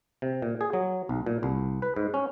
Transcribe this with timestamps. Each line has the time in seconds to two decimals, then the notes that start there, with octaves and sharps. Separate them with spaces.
0.22 C3
0.42 A#2
0.61 G#4
0.73 F#3
1.09 B1
1.26 A#2
1.43 C2
1.82 B4
1.96 G#2
2.14 C#4